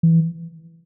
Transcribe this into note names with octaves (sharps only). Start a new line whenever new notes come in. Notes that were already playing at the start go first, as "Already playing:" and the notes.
E3